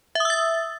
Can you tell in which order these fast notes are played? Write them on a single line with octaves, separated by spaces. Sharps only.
E5 D#6 E6 A6